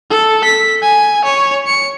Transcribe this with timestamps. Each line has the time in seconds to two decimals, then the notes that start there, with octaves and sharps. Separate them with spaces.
0.10 A4
0.44 B6
0.82 G#5
1.25 C#5
1.67 C#7